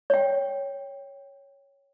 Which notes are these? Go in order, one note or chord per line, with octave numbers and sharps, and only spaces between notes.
C#5 G5